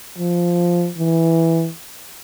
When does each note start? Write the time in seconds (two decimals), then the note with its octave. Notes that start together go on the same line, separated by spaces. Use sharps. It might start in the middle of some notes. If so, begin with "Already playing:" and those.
0.18 F3
0.98 E3